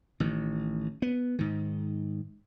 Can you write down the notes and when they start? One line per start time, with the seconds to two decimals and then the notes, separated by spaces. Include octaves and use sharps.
0.20 A1 D#3
1.02 B3
1.39 G#2 D#3